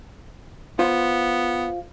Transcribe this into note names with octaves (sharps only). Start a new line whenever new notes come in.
B3 F4 C5